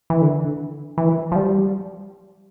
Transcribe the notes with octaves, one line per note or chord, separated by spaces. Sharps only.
E3
D3
E3
F3
G3